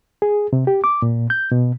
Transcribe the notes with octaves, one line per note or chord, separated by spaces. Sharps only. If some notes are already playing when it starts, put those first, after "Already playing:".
G#4
C3
G4
D6
A#2
G6
B2